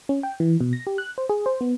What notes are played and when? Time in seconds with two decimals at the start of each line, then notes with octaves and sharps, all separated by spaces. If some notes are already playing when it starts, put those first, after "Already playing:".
0.09 C#4
0.23 G5
0.40 E3
0.61 B2
0.73 A#6
0.87 G4
0.98 F#6
1.18 C5
1.29 G#4
1.46 C5
1.61 B3